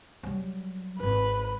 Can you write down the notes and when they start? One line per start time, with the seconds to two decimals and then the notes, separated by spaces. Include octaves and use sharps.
0.23 F#3 G3
0.99 D1 G#1 B4